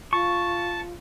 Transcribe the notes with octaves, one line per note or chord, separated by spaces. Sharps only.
F4 A5 C#6